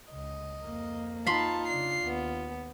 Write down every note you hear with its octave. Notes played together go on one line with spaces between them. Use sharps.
C#2 D#5
F2 A#3
D#4 F4 A5 B5 C6
C#3 D4 C7
D#2 B3